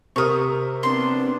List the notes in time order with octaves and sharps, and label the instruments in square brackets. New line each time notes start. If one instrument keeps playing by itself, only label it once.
[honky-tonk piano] C3 A#4 F6 [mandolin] C#6 D#6
[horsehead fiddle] B3 D4 [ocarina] C4 [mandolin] C6